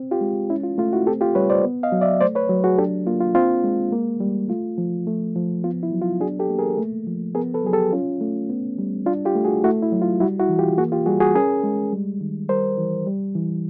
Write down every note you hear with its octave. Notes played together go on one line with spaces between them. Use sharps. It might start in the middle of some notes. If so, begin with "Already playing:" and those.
Already playing: C4
F4 G4
G#3
C#4 E4
F4
A3 F4
E4 F#4
C4 G4 A4
F4 G4
G3 B4 C#5
C5 D5
B3
D#5 F5
F#3
D5 E5
A3 C5 D5
B4 C#5
F#3
F#4 G#4
D4 G4 A4
A#3 F4
F4
C4 F4
G#3
A#3
G3
A3 F4
F3
A3
F3
B3 F4
E4
F#3
F4
D4 F#4 G#4
G4 A4
A#3
G#4 A#4
A3
F3
B3 G#4 A#4
A4 B4
F#3 G#4
G4 A4
C#4 F4
A3
B3
G3
D4 F4
F4 G4
A3
F#4 G#4
A3 E4 F#4
E4
F#3
F4
G3 E4 F#4
E4 F#4
E3
F4 G4
A#3 F#4 G#4
F4 G4
G3 F#4 G#4
F#4 G#4
C#4 G#4 A#4
G#3
G3
D#3
G3 A#4 C5
E3
G3
E3